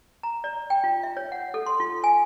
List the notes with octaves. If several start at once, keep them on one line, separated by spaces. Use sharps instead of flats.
A#5
D5
G5
F4
E5
C#5
F#5
A4
C6
F4
G#5